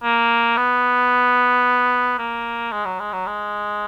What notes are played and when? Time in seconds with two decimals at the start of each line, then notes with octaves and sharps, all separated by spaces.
0.03 A#3
0.57 B3
2.18 A#3
2.72 G#3
2.85 F#3
3.00 G#3
3.13 F#3
3.26 G#3